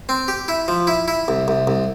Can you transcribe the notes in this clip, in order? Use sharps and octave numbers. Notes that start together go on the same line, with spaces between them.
C4
G4
E4
F3
E4
E4
C2
C2
C2